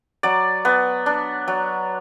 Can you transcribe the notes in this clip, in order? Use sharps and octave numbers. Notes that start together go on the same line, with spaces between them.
F#3 D5
B3
D4
F#3